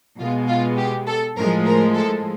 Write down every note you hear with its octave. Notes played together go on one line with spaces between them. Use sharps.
B2 G#3 B3 F4
F4
G4
A4
A2 F3 G#3 A#4
A#4
A4